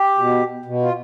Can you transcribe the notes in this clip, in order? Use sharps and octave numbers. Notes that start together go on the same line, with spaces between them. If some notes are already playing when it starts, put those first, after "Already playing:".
Already playing: G4
B2
B2
F4